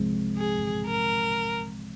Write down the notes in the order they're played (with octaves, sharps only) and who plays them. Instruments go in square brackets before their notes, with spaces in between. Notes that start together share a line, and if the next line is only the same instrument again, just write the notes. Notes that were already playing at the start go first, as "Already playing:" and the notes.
Already playing: [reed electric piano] C2 C3 F3 G#3 C4
[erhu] G#4
A#4